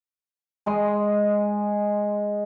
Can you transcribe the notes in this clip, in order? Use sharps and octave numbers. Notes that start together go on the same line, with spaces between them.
G#3 D#5 C6